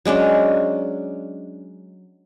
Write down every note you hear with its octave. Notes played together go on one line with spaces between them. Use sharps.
F#3 G#3 C#4 D4